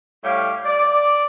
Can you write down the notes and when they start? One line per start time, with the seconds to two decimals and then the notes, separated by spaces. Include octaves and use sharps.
0.24 A2 G3 G4 C#5 F5
0.65 D5